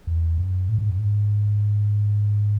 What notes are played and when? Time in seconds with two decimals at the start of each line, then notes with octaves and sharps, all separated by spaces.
0.07 E2
0.38 F#2
0.69 A2
0.78 G#2
0.89 F#2
0.98 G#2